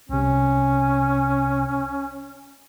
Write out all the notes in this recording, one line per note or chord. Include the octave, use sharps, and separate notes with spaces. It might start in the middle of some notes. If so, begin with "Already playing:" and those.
C2 C3 C#4